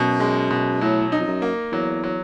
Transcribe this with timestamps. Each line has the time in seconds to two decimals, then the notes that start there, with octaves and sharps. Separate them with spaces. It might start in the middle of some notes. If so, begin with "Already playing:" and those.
Already playing: F#2 B2
0.20 G#3
0.51 B2
0.81 A2 F#3
1.12 D#4
1.20 F2
1.28 F#2
1.42 A#3
1.72 E2 F#3
2.04 F#3